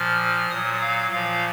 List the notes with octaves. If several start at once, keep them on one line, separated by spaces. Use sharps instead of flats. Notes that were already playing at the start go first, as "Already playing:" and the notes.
Already playing: A#2 F3 F6
A#2 F#3 D#6
F5
A#2 F3 F5